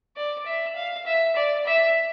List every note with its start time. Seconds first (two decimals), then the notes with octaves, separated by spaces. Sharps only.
0.16 D5
0.45 E5
0.76 F5
1.05 E5
1.35 D5
1.66 E5